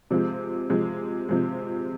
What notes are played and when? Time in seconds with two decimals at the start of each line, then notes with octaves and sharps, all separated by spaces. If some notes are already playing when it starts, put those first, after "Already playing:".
0.11 C3 F3 G#3
0.69 C3 F3 G#3
1.29 C3 F3 G#3